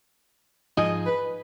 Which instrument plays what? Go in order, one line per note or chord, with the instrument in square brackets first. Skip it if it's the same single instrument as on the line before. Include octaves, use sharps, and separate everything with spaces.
[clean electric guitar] G#2 F3 G#3 D#4 G#4 [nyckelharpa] D#5
[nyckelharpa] B4